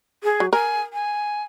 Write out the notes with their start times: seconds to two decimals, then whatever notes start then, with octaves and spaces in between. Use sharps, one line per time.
0.24 G#4
0.40 F#3
0.53 A#4 G#5
0.93 G#5